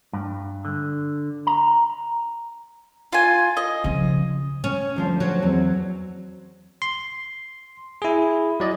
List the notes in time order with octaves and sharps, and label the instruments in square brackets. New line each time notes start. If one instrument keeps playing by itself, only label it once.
[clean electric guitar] G2
D3
A#5
[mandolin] F4 G#5
D#5
[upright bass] C#3 F3
[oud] C#4
[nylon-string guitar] D2 F3 C5
[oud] F#3
[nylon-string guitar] E2 C4
[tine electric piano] C6
E4 G#4
F#3 D5 D#5